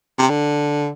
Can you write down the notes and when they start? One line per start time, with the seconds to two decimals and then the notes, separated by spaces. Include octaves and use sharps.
0.19 C3
0.30 D3